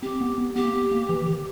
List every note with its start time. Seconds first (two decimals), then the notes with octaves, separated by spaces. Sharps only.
0.03 C4 G4
0.21 B3
0.38 B3
0.56 B3 G4
0.65 A#3
0.74 B3
0.91 A#3
1.09 E3
1.27 D#3